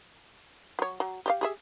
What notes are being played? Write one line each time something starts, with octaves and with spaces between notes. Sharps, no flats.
F#3 C#5
F#3
G4 D5 F5
G4 G#4 E5